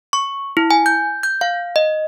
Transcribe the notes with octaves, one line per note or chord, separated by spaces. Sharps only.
C#6
E4
G#5
G6
G6
F5
D#5